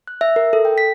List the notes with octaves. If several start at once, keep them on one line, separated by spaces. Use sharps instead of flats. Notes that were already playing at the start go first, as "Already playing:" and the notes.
F#6
E5
A#4
A4
G5
B6